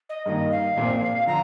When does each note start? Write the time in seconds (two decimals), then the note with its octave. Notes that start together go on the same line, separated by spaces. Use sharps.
0.09 D#5
0.26 G2 D#3 A#3 D#4 D#5
0.51 F5
0.77 A#1 A#2 F3 C4
1.27 D3 F3 A#5